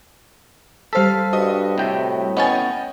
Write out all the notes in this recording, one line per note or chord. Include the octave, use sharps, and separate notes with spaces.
G3 A4 C5 F5 B6
G2 F#4 D#5 D#6
A2 C3 G5
B3 C#4 D#5 G5 G#5 A6